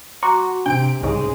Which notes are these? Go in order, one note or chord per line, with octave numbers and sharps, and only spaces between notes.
F#4 A#5 C6 D6
C3 D4 G5 D7
C2 G#2 C#3 G#3